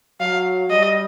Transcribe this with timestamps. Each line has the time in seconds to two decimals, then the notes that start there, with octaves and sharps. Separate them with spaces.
0.20 F#3 F5
0.70 G3 D#5